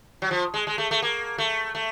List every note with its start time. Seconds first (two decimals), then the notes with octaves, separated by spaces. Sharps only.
0.22 F#3
0.31 F3
0.54 G#3
0.67 G#3
0.78 A3
0.91 A3
1.02 A#3
1.38 A3
1.75 A3